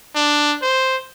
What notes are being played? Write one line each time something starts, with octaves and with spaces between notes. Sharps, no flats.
D4
C5